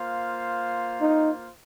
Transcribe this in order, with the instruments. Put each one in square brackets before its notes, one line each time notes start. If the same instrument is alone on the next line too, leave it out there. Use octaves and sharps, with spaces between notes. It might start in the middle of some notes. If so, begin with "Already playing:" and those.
Already playing: [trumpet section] A#3 F4 C5 F5
[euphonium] D#4